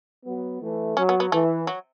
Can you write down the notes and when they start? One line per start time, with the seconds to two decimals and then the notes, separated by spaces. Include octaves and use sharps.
0.25 F#3 B3
0.61 E3 A3
0.97 F#3 C#4
1.09 B3
1.20 B3
1.32 E3 A3
1.67 F#3